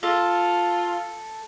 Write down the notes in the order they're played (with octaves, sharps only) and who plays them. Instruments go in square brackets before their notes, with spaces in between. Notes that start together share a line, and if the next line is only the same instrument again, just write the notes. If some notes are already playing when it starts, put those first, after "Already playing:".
[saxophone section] F4 [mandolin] A4